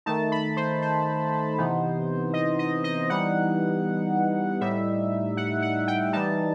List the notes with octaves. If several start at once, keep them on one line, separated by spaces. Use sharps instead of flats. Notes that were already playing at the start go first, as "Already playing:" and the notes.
D#3 A3 D#4 A5
B5
C5
C5
C3 E3 B3 D#4
D#5
D#5
D#5
E3 G3 B3 D#4 F#5
A2 G3 D#4 E5
F#5
F#5
G5
E3 G3 D#4 A5